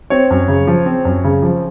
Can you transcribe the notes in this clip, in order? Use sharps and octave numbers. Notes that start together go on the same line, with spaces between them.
C4 C#5
F#2
C#3
F3
C4
F#2
C#3
F3